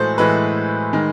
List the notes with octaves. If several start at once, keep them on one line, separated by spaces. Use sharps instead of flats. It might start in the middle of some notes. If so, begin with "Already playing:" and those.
Already playing: A2 E3 G#3 F#4 G#4 A4 C5
A2 E3 G#3 B4
D#3 G#3